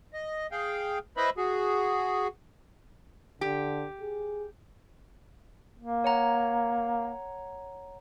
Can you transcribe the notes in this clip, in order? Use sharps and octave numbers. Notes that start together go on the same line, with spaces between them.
D#5
G#4 F5 G5
E4 B4 C5 D#5 E5 B5
F#4 G#4
D3 G4
G#4
A#3
C#5 F#5 A#5